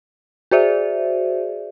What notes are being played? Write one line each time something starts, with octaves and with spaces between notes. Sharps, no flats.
F#4 G#4 C5 D5 E5